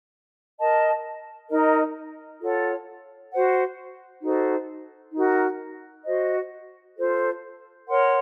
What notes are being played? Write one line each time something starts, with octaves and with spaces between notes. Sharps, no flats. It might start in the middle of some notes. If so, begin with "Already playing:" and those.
A#4 D#5 A5
D#4 A#4 D#5
F4 A4 C#5 F#5
F#4 C5 F#5
D#4 F#4 A4 C5
D#4 F#4 A#4
F#4 C5 D#5
F4 A4 C5
A#4 C#5 F#5 C6